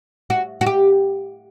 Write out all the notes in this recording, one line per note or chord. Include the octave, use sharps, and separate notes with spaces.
F#4
F#4
G4